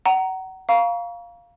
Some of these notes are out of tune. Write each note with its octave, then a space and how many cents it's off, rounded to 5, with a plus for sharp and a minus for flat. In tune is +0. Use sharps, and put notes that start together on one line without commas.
F#5 +35 A#5 +0
F5 +0 A#5 +30 C#6 +30